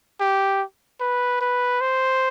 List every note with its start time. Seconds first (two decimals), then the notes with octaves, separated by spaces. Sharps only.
0.20 G4
1.00 B4
1.41 B4
1.81 C5